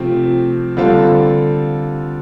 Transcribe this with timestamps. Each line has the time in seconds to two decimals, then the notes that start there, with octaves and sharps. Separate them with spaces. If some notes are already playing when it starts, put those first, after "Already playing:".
Already playing: C3 F3 A3 C4 G4
0.77 D3 G3 C4 F4 A4